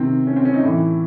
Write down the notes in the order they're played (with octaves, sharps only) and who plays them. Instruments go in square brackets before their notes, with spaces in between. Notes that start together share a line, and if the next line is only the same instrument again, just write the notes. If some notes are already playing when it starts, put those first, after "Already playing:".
Already playing: [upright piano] C3 D#3 C4
C#4
C4
C#4
D#4
A2 E3 E4